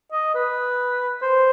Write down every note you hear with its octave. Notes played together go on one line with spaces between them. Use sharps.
D#5
B4
C5